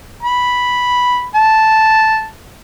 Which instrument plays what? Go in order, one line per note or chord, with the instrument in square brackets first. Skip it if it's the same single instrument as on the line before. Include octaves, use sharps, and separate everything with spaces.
[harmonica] B5
A5